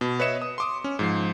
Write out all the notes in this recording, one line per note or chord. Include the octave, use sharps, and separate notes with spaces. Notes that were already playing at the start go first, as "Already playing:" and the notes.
B2
B4 C#5 D#5 E5 C#7 E7
D#6
C6 D6 D#6
C#4
G#2 F3 C7